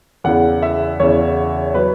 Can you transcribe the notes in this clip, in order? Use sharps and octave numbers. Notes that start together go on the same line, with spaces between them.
E2 C#3 E3 F#5
E5
E2 C#3 E3 C#5
F#3 B4